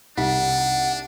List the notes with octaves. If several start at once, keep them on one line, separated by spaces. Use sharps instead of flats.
C2 D4 D#4 F#5